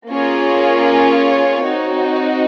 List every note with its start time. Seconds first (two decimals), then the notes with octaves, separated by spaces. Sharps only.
0.10 A#3 C#4 F4 G#4 C#5
1.64 C4 D#4 F#4